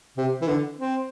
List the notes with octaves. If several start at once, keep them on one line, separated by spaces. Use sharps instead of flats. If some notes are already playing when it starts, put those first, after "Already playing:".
C3
E3
D3
C4